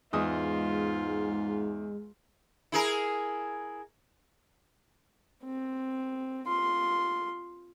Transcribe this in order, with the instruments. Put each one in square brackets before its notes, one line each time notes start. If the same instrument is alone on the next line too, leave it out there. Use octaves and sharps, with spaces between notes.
[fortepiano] E2 D#5 D#6 [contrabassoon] G#2 [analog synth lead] G#3 [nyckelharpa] F4
[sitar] E4 G#4 A#4
[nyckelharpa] C4
F4 C6